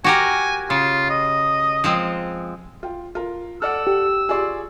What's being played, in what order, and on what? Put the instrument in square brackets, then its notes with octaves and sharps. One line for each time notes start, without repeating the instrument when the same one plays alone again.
[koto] F#4 G4 A#4 [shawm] G#5
[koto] C#3 [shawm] F4
[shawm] D#5
[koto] F3 G#3 C4
[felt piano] F4 G5
F4 A#4
[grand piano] A4 D5 F#5 [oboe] E6 [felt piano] F6
[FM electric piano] G4
[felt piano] F4 C6 C#6 [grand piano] G#4 D5